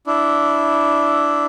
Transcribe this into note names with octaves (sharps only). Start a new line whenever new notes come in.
D4 E4